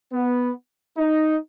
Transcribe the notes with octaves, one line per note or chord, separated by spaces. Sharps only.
B3
D#4